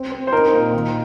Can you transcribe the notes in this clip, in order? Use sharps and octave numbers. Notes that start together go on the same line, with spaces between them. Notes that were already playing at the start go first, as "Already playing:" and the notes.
Already playing: C4
C4
C5
D#4 A#4
A#2
D#3